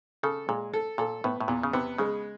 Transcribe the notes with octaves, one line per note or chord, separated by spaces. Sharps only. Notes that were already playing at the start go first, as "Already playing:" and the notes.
C#3 A4
A#2 G#3
A4
A#2 A4
A2 B3
A2
E2 A#2
C#3
C3 B3
C#3 G#3